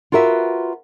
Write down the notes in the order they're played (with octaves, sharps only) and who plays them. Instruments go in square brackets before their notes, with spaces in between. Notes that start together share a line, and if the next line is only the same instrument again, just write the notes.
[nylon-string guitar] F4 F#4 A#4 B4 E5